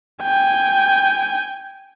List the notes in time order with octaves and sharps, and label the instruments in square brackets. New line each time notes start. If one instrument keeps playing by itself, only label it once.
[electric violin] G5 G#5